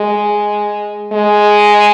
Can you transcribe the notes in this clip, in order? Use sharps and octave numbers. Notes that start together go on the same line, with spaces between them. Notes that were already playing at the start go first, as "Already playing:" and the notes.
Already playing: G#3
G#3